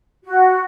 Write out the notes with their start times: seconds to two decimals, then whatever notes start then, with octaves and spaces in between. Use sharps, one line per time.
0.25 F#4